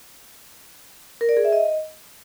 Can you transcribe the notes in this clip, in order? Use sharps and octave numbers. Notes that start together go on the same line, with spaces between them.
A#4
D5
G#4
E5
D#5